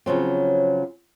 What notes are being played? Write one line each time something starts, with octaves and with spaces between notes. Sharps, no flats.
C#3 F3 F#3 C4